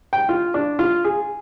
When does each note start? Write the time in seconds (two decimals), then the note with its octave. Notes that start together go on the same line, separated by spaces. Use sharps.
0.13 G5
0.29 F4
0.54 D4
0.79 F4
1.04 G#4